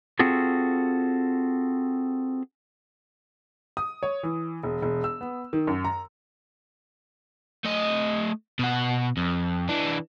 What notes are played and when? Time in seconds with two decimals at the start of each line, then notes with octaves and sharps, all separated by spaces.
0.19 C4 F4 F#4 G#4 A4
3.77 D#6
4.03 C#5
4.23 E3
4.63 E1
4.82 E1
5.04 E6
5.21 B3
5.53 D#3
5.67 F#2
5.85 A#5
7.65 A3 D#5
8.59 B2 F#5
9.17 F2
9.69 E3 D4